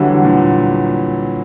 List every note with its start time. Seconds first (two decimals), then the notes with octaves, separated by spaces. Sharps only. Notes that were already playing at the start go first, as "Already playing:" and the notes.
Already playing: D3 E3 F#3 G3
0.25 A#2